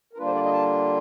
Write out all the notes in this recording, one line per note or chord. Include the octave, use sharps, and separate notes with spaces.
A#4
D3 G3 A#3 D4 F4 B4
C5
D5
D#5
A5